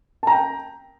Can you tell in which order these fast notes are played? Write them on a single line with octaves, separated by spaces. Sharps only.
A5 A#5 G5